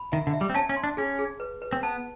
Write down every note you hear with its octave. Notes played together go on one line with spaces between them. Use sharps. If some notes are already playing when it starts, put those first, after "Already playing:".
Already playing: B5
D#3 E5
D3
E5
G3
C4
C#4 A5
C#4
C6
D4
C#4 G#4
G#4
B4
B4
C4
B3 A5